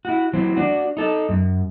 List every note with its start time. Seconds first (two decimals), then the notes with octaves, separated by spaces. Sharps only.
0.05 E4 F#4
0.33 E3 F#3 C4
0.57 D4 F#4
0.97 D#4 A4
1.29 F#2